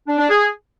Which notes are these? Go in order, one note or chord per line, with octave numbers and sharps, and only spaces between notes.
D4
D4
G#4